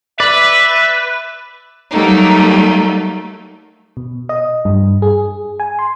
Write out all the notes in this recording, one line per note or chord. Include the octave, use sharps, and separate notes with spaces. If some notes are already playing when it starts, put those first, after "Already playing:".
B4 D5 E5
F#3 G3 A3 A#3 D#4
B2
D#5
G2
G#4
G#5
C6